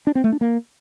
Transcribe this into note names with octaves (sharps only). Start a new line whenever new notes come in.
D4
C4
A3
D4
A#3